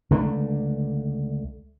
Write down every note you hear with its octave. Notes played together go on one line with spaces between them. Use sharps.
C#2 D3 A3 D4